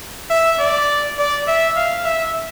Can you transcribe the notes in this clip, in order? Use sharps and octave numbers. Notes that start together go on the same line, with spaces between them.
E5
D5
D5
E5
F5
E5